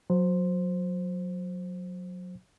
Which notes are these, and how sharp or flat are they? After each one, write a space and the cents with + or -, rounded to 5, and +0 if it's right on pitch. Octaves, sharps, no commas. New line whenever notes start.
F#3 -25 C5 +0